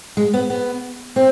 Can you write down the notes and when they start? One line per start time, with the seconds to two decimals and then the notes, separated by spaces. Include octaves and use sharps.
0.17 G#3
0.34 B3
0.50 B3
1.16 C4